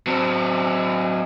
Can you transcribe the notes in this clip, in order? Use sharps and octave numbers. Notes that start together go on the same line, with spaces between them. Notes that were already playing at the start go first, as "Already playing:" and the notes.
F#3 C4